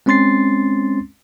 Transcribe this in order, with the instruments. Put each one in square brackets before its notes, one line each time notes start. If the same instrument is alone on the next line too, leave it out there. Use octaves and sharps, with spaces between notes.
[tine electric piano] G#3 C4 C#4 C6 A6 C7